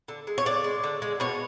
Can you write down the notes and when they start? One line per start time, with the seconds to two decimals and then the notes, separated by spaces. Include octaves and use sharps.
0.08 D3
0.27 G#3
0.38 C#5
0.46 D3 D5
0.64 G#3
0.84 D3
1.02 G#3
1.20 B2 C#5